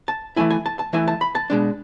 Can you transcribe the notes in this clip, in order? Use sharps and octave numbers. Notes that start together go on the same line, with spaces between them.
A5
E3 A3 E4 G#5
G#5
A5
A5
E3 A3 E4 G#5
A5
B5
A5
B2 G#3 D4